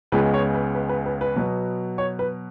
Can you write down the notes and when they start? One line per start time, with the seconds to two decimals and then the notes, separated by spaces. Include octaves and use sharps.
0.12 C#2 C#3 G#3 B3 B4
0.34 C#5
0.54 B4
0.75 B4
0.89 B4
1.06 B4
1.21 B4
1.36 B2 F#3 B3
1.98 C#5
2.19 B4